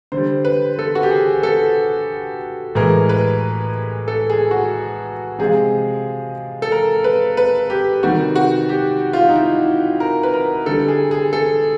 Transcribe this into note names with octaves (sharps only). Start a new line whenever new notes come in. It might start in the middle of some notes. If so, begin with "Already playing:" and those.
D3 C5
G3
B4
A4
F#4
G4
G#4
A4
A2 E3 G#3 A#4
B4
A4
G#4
F#4
C3 F3 G#3 G#4
A4
A#4
B4
B4
G4
C3 D#3 G3 F#4
F#4
G4
F4
D#4
E4
A#4
B4
A#4
D3 G3 A4
G#4
G#4
A4